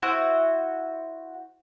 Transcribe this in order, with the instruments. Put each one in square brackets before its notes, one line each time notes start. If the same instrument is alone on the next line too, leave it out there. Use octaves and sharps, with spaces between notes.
[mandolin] E4 F#4 C5 F#5